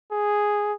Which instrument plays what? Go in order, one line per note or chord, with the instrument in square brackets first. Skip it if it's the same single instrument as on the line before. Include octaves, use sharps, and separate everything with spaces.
[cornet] G#4